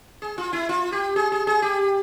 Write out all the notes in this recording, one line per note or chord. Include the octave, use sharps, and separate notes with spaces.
G#4
F4
E4
F4
G4
G#4
G#4
G#4
G4